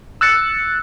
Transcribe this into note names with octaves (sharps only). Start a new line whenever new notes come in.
E6 F#6 A6 C#7